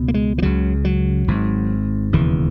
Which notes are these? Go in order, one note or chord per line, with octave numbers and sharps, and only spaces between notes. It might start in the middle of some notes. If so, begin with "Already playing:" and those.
Already playing: C#2 B2
A#3
G#3
E3
C#2 C#3 F#3
F#3
G#1 G#2
E1 D#2 C#3 E3